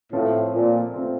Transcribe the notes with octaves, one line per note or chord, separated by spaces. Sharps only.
A2 F3 A3 C4 F4
A#2
F3 A3 C4 F4